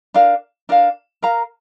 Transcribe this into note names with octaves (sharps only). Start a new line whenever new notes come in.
D4 A#4 F5
D4 A#4 F5
A#4 F5 A#5